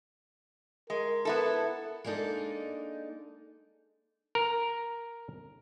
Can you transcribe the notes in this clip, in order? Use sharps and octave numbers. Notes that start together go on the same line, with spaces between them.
G#3 A#4
B3 E4 A4
G#3 A#3 D4 D#4 A4
A#4